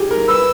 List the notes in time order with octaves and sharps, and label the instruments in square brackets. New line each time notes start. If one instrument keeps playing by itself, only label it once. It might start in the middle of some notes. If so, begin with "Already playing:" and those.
Already playing: [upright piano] G4 G#4
A#4
[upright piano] B4 [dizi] E6